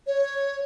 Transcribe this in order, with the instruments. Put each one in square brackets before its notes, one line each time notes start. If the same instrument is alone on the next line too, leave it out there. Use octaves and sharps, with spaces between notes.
[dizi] C#5